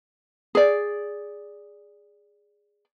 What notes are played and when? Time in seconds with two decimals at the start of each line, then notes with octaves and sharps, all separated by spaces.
0.55 G#4 D5